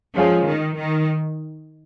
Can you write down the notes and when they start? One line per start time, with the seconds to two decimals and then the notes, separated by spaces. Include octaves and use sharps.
0.16 F3 G#3 C#4 F4 G#4 C#5
0.48 D#3
0.79 D#3